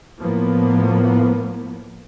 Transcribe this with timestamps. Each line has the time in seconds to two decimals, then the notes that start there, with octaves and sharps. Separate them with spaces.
0.19 A2 F3 A#3 B3